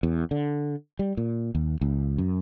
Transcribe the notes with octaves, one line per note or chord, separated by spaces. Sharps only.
E2
D3
G3
A#2
D#2
C#2
F#2